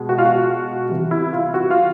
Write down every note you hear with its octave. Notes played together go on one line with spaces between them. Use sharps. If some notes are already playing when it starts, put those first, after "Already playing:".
Already playing: B2 G#3
F#4
F4
F#4
C3 E3 G3
E4
F4
F#4
F4